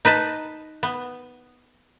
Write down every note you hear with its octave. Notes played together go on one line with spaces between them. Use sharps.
D#4 B4 D#5 A5
B3